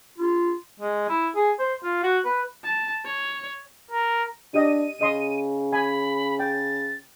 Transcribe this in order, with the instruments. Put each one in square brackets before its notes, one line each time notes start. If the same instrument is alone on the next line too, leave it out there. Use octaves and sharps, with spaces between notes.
[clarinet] F4
[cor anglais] G#3
E4
G#4
C5
F4
F#4
B4
[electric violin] A5
C#5
[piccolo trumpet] A#4
[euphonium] D4 [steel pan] G4 D#5 [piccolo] D#7
[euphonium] C#3 [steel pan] D#5 C6 D#6
[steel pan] G#5 [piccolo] B5
[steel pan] G5 [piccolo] A6